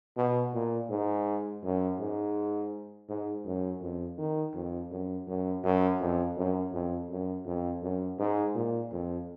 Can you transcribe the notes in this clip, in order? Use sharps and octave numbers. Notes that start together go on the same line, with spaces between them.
B2
A#2
G#2
F#2
G#2
G#2
F#2
F2
D#3
F2
F#2
F#2
F#2
F2
F#2
F2
F#2
F2
F#2
G#2
A#2
F2